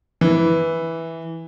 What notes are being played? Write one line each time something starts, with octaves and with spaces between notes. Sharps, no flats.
E3